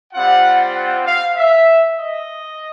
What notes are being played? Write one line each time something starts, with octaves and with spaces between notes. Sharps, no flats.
G3 C4 F4 F#5
F#5
F5
E5
D#5